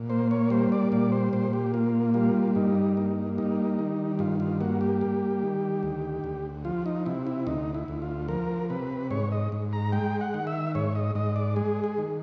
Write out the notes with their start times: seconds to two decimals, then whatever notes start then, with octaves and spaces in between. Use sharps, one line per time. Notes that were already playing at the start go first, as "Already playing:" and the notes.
Already playing: A#2
0.10 A#3 C5
0.31 C#5
0.50 G3 C5
0.72 D5
0.92 A#2 D5
1.12 C5
1.33 A#2 C5
1.53 G4
1.74 A#3 F4
2.14 G3 F4
2.55 G2 D#4
2.97 A#3
3.38 G3 D#4
3.79 D#3
4.19 G2 F4
4.40 F4
4.61 A#3 F#4
4.81 G4
5.01 G3
5.43 D#3
5.83 D2
6.24 D2
6.65 F3 F4
6.86 D#4
7.06 C3 E4
7.27 E4
7.47 D2 D#4
7.75 E4
7.88 D2
8.02 F4
8.28 F3 A#4
8.70 C3 B4
9.11 G#2 C#5
9.32 D#5
9.52 G#2
9.73 A#5
9.92 G#3 G5
10.21 F#5
10.34 D#3
10.47 E5
10.75 G#2 C#5
10.95 D#5
11.15 G#2 D#5
11.36 D5
11.56 G#3 G#4
11.84 G#4
11.98 D#3